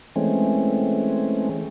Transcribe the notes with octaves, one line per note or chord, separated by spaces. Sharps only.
E3 G#3 A3 C4 C#4